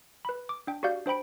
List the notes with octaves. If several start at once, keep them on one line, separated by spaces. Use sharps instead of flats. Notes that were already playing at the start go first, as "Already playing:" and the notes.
B4 B5
D6
D4 G5
F#4 G4 D5 F5 G6
D4 C5 G5 B5 D7